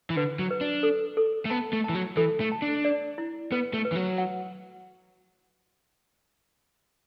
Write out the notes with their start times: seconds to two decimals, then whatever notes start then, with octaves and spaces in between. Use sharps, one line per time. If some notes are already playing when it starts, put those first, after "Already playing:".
0.10 E3
0.16 D3 B4
0.39 F#3
0.51 B4
0.61 D4
0.83 A4
1.17 A4
1.45 A3
1.50 B3 A5
1.73 A3
1.84 E3 A5
1.95 F#3
2.17 E3 A4
2.40 A3
2.52 A5
2.62 D4
2.85 D5
3.18 E4
3.52 B3 B4
3.74 A3
3.85 B4
3.92 E3
3.96 F#3
4.18 F#5